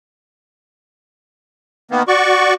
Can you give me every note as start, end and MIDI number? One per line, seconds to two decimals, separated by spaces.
1.91 2.03 51
1.91 2.03 58
1.91 2.03 59
2.08 2.54 66
2.08 2.54 74
2.08 2.54 85